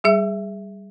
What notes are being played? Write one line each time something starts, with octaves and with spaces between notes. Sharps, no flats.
G3 G#4 E5